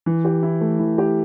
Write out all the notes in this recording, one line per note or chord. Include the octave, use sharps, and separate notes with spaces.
E3
G4
E4
A3
E3
G4